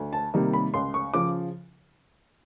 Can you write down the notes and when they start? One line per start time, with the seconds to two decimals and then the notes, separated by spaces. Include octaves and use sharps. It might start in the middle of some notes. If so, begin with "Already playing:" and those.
Already playing: D2
0.13 A5
0.34 C3 D#3 G3 A#3
0.53 B5
0.74 C#2 C6
0.94 C#6
1.14 C#3 F3 D6